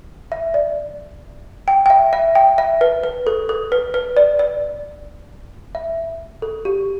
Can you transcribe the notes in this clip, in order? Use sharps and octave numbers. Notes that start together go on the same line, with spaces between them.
E5
D5
G5
G5
E5
E5
G5
E5
B4
B4
A4
A4
B4
B4
D5
D5
E5
A4
G4